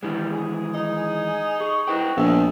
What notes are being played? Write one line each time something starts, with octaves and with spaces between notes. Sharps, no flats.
D#3 E3 G3 G#3
G#4
D#4
G#4 C#6
C2 E4 F#4 B4 G5
A#1 G#3 B3 G#4 E6